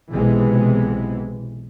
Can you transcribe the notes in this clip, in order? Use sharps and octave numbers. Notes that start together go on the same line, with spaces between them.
B1 C3 E3 G#3 B3